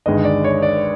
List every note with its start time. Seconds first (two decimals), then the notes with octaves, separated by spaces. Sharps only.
0.06 G1 G2 D#3 G#3 D#5
0.24 D5
0.44 C#5
0.62 D5